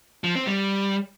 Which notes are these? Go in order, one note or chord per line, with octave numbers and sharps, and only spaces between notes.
F3
C4
G3